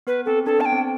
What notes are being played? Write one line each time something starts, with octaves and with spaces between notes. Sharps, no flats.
B3 B4
C4 A4
D4 A4
B3 A5
G5
C4